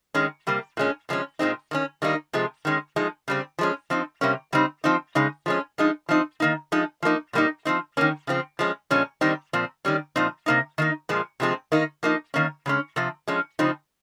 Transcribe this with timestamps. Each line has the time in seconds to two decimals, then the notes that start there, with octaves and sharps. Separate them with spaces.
0.14 D#3 G#3 C#4
0.47 C3 G3 A#3
0.77 A#2 G#3 C#4
1.09 C3 F3 G#3 C#4
1.39 A#2 G#3 C4 D#4
1.71 D#3 A#3 C#4
2.02 D#3 G3 A#3 D#4
2.33 C3 F3 G#3
2.65 D#3 G#3 C#4
2.96 F3 G#3 D#4
3.28 C#3 G3 C4
3.59 F3 G#3 C#4
3.90 F3 C4 D#4
4.21 C3 G3 A#3 C#4
4.53 C#3 G3 C4 D#4
4.84 F3 C4 D#4
5.15 C#3 G#3 D#4
5.46 F3 G#3 C#4
5.78 F3 G#3 D#4
6.09 F3 C4 D#4
6.40 D#3 A#3 D#4
6.72 F3 G#3 D#4
7.03 F3 A#3 D#4
7.33 A#2 G3 A#3 D#4
7.65 F3 C4 D#4
7.97 D#3 A#3 C#4
8.27 C#3 F3 C4
8.59 F3 G#3 C#4
8.90 A#2 F3 G#3 C#4
9.21 D#3 G3 C4 D#4
9.53 A#2 F3 C4
9.85 D#3 G3 C#4
10.16 A#2 F3 C4 D#4
10.46 C3 D#3 A#3 D#4
10.78 D#3 A#3 D#4
11.09 A#2 F3 G#3
11.40 C3 F3 G#3 C4
11.72 D#3 A#3 D#4
12.03 F3 A#3 D#4
12.34 D#3 A#3 C#4
12.66 C#3 G#3 C#4
12.96 C3 F3 C4
13.28 F3 G#3 C#4
13.59 C#3 F3 C4 D#4